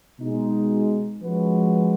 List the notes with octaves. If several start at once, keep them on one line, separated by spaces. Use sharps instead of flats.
B2 G#3 D#4
F3 G#3 C#4 F#4 B4